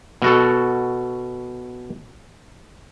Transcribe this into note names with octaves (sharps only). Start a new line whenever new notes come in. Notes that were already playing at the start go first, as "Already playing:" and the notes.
B2 F#4 A4